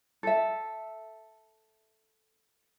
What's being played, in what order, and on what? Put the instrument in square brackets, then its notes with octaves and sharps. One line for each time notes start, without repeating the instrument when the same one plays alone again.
[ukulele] A4 E5